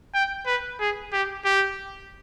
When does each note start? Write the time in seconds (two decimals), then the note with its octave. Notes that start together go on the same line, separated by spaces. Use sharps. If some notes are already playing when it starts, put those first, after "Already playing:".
0.14 G5
0.46 B4
0.80 G#4
1.12 G4
1.45 G4